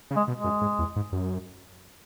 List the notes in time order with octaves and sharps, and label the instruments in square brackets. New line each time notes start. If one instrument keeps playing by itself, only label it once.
[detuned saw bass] C#3
[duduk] G#3
[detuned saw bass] B2
[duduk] G#3
[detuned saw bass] F#2
G#2
E2
G#2
F#2